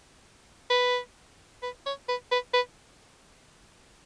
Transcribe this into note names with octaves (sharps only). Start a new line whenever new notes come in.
B4
B4
C#5
B4
B4
B4